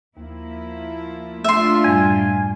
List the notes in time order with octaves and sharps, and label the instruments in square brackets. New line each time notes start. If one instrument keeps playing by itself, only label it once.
[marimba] D#2 [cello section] F3 A#3 E4
[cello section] A3 D4 F4 [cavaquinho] E5 C6
[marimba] F#2 A2 G3 [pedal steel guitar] G#5